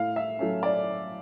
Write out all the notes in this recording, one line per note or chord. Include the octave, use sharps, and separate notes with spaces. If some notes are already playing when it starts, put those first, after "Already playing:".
Already playing: A2 F5
E5
F#3 A3 C#4
D5